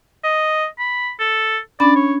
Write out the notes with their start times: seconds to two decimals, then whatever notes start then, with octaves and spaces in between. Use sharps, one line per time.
0.24 D#5
0.79 B5
1.19 A4
1.80 C#4 D4 D5 B5
1.96 C#5